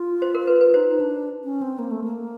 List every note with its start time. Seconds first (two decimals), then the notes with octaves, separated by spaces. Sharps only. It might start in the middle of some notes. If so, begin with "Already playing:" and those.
Already playing: F4
0.22 C5
0.35 A#4
0.47 B4
0.61 B4
0.74 D#4 C5
0.90 D#4
1.00 D4
1.44 C#4
1.62 C4
1.79 A#3
1.91 A3
2.04 A#3